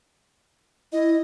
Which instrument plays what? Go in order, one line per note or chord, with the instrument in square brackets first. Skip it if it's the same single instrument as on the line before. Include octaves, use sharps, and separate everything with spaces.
[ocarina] E4 [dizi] D#5